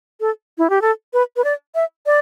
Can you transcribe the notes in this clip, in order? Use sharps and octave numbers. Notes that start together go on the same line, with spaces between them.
A4
E4
G4
A4
B4
B4
D5
E5
D5